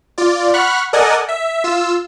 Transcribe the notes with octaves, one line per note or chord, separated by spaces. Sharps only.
F4 D5
F#5 B5 C#6 F6 F#6
A4 A#4 D5 D#5 F#5 G#5
E5
F4 E6